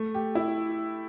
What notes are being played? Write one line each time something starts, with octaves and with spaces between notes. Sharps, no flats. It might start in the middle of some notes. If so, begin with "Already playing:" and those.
Already playing: A3
G4
E4